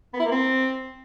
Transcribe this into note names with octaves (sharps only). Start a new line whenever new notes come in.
B3
E4
A#3
C4